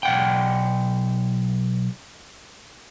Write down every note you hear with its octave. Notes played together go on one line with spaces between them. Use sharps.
B1 F#5 G5